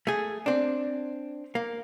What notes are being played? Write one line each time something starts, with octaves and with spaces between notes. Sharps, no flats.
A3 G#4
C4 D4
A#3